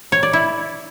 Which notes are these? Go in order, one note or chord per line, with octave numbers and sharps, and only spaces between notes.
C#5
D5
E4